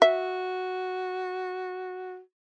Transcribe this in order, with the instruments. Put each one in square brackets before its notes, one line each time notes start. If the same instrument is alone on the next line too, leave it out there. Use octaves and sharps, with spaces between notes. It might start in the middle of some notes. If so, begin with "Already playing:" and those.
[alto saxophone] F#4 [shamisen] E5